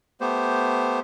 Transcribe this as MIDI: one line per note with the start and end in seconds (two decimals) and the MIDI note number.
0.21 1.00 57
0.21 1.00 59
0.21 1.00 67
0.21 1.00 72